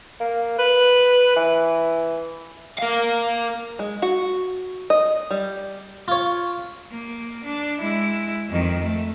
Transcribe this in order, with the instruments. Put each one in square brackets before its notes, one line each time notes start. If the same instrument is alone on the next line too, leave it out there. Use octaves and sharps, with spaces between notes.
[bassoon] A#3
B4
E3
[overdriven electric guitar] A#4 F5
[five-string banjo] G#3
F#4
D#5
G3
[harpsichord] F4 C#5
[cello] A#3
D4
G#3 E4
F2 D#3
A3